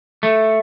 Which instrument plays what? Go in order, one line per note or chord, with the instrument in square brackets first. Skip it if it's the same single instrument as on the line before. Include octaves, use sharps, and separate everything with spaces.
[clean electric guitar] A3